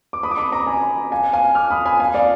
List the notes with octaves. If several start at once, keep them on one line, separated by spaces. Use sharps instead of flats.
D6
B5 D#6
D6
B5 D#6
A#5 D6
G#5 B5
F5 G#5
F5 G#5
D6 F6
B5 D#6
G#5 B5
F5 G#5
D5 F5